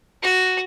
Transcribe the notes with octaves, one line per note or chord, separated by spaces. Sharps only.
F#4